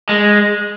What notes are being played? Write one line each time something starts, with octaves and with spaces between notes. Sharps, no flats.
G#3